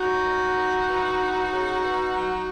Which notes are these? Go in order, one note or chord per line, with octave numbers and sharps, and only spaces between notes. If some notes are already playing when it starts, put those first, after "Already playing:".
Already playing: F#2 D#4 F#4
D#3
D#3
E3
E3
C#3
B2
F#3